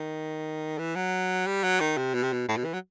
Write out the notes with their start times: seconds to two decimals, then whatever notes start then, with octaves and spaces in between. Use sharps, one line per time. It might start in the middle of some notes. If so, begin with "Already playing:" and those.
Already playing: D#3
0.78 E3
0.96 F#3
1.47 G3
1.63 F#3
1.80 D#3
1.97 C3
2.14 B2
2.23 C3
2.33 B2
2.48 A2
2.57 B2
2.65 E3
2.73 F#3